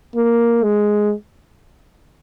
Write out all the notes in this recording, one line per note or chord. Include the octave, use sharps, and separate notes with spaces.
A#3
G#3